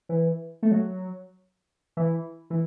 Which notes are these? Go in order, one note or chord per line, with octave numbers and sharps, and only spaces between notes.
E3
A3
F#3
E3
E3